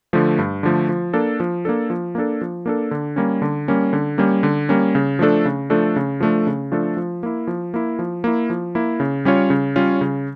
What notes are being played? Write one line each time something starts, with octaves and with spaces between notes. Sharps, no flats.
D3 F3 A3
G2
D3 F3 A3
F3
A#3 D4 A4
F3
A#3 D4 A4
F3
A#3 D4 A4
F3
A#3 D4 A4
D3
G3 A#3 C#4
D3
G3 A#3 C#4
D3
G3 A#3 C#4
D3
G3 A#3 C#4
C#3
F3 A3 D4 A4
C#3
F3 A3 D4 A4
C#3
F3 A3 D4 A4
C#3
F3 A3 D4 A4
F3
A#3 E4
F3
A#3 E4
F3
A#3 E4
F3
A#3 E4
C#3
G3 C#4 F4 C#5
C#3
G3 C#4 F4 C#5
C#3